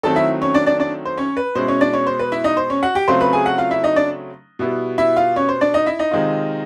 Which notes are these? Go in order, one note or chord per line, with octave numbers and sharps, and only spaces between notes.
D#3 F#3 A3 C4 A4 A5
E4 E5
C#4 C#5
D4 D5
D4 D5
D4 D5
C5
C#4 C#5
B4
B2 G#3 C#4 E4 C5
C#4 C#5
D4 D5
C#4 C#5
C5
B4
E4 E5
D#4 D#5
C5
C#4 C#5
F#4 F#5
G4 G5
C#3 F#3 A3 C4 F4 C5 C6
B4 B5
G#4 G#5
F#4 F#5
F4 F5
E4 E5
D#4 D#5
D4 D5
B2 G3 B3 E4
E4 E5
F4 F5
C#4 C#5
C5
D4 D5
D#4 D#5
E4 E5
D#4 D#5
C3 D#3 G#3 C4 F4